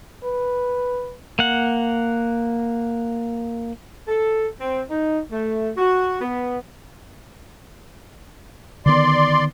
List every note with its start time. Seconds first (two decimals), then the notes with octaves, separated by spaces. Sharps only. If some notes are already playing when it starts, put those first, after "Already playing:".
0.24 B4
1.39 A#3 F#5
4.08 A4
4.60 C4
4.90 D#4
5.31 A3
5.77 F#4
6.21 B3
8.86 D3 D#3 B3 D5 C6